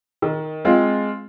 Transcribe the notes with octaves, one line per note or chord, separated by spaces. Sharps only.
D#3
G#3 C4 F4